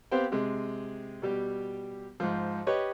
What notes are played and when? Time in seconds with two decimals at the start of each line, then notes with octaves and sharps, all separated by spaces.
0.11 B3 C4 G4 C5 F5 G5
0.32 C3 G#3
1.22 B2 G3 G4
2.20 G#2 F3
2.67 G4 B4 C#5 D#5